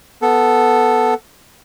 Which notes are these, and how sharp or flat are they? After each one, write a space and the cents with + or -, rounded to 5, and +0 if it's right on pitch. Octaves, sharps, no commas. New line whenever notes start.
B3 +0 A4 +0